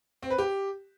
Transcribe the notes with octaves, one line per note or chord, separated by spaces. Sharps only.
C4
B4
G4